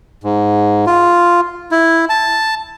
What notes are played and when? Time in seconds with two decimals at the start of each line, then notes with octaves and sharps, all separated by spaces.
0.24 G#2
0.87 F4
1.71 E4
2.09 A5